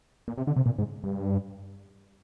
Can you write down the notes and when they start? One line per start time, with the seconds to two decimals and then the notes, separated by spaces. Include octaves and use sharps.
0.28 A#2
0.38 C3
0.47 D3
0.56 C3
0.66 A#2
0.79 G#2
1.04 G2